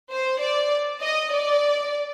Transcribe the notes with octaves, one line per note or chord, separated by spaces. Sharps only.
C5
D5
D#5
D5